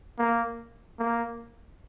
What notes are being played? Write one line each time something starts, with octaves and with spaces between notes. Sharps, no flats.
A#3
A#3